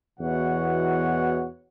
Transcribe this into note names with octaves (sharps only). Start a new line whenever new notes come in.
E2 B2 E3 F#4 C#5 F#5